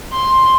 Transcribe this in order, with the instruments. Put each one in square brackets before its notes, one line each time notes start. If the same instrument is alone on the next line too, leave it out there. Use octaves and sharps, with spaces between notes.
[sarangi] C6